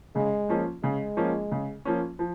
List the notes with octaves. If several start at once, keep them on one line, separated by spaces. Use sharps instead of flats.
C#3 G#3
F3 A#3 C#4
C#3 G#3
F3 A#3 C#4
C#3
F3 A#3 C#4
F3